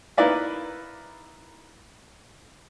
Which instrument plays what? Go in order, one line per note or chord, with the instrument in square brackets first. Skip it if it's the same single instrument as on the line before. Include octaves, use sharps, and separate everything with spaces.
[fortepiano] A#3 D#4 E4 B4 D5 E5